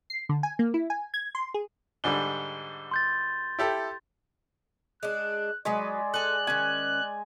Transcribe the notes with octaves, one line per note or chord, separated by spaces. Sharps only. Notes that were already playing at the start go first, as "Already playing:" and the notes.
C7
D3
G#5
A#3
E4
G#5
G#6
C6
G#4
G#2 D3 G3 G7
C6 G6 A6
E4 G4 A4
G#3 D4 F#6
F#3 G#3 B4 D5 D#5
A4 G#5 F#6
D#3 C#4 G#5